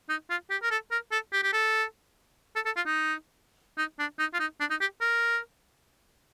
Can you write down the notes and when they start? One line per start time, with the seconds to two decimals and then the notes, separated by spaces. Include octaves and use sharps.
0.09 D#4
0.30 F4
0.50 G4
0.63 A#4
0.71 A4
0.91 A#4
1.12 A4
1.32 G4
1.43 G4
1.53 A4
2.55 A4
2.65 A4
2.76 F4
2.86 D#4
3.78 D#4
3.99 D4
4.19 D#4
4.34 F4
4.40 D#4
4.60 D4
4.70 D#4
4.81 G4
5.01 A#4